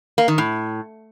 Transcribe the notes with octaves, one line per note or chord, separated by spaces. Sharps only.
A#3
D#3
A2